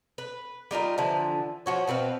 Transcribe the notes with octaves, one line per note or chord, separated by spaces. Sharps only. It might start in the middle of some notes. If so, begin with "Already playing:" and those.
B4
G3 D#4 F4 A#4
D3 E3 F3
F3 F#4 C#5
B2 C4 B4 F5